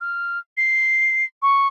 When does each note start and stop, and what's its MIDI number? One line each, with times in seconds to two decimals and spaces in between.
0.01 0.39 89
0.57 1.25 96
1.42 1.67 85